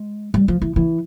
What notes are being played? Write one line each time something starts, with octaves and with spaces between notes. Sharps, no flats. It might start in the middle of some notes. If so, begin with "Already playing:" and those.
Already playing: G#3
G3
F3
E3
E3